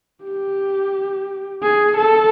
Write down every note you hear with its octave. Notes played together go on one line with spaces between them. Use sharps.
G4
G#4
A4